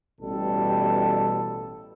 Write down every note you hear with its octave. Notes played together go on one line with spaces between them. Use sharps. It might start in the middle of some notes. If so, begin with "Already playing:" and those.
A1 B2 G3 A4